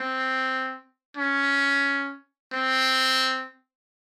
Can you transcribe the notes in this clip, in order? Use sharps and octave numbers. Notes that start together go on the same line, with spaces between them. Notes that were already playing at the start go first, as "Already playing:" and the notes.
Already playing: C4
C#4
C4